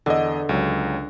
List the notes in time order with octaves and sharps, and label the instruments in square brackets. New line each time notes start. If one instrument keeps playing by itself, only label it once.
[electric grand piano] E2 D#5 [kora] D3
[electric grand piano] C#2 F#3